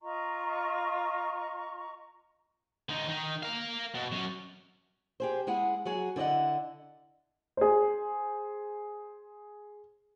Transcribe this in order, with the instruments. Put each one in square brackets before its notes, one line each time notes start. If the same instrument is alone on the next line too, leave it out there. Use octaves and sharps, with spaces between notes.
[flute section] F4 D#5 A#5 C#6
[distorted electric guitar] D3 D#4
D#3 D#4
A#4 F5
B2
F#3 C#4
[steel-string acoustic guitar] G4 G#4 C5
G#3 E4 G#4 F#5
F#3 F#4 G#4
D3 E4 D5 D#5 F#5
[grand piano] G#4 C5